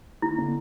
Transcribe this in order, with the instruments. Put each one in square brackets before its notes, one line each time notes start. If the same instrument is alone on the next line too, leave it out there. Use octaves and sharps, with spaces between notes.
[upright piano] D#3 [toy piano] E4
[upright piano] D3